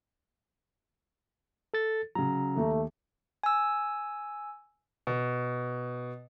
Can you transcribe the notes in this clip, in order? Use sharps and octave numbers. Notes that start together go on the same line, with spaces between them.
A4 A6
C#3 F#3 A#5
D#2 A3
G#5 E6
B2